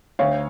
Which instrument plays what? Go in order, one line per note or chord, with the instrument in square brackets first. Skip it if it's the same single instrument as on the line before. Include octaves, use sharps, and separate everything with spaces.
[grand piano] D2 C#5 F5